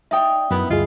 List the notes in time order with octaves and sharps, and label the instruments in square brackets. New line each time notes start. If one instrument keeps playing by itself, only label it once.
[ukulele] D#4 D5 G5 [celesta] E5 D#6
[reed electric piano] F#2 [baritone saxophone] B3 [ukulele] D#4 E4
[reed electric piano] D2 G2 G#4 [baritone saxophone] F4 [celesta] D#5